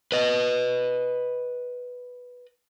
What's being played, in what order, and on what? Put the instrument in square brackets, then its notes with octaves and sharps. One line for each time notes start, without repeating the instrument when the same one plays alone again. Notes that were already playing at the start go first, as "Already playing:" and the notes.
[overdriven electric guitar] B4 D#5